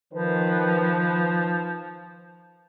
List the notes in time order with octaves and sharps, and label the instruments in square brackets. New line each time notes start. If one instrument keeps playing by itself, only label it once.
[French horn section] D#3 B4 [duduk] F3